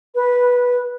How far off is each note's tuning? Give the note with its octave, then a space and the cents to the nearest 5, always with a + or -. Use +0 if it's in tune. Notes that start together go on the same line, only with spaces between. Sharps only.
B4 -10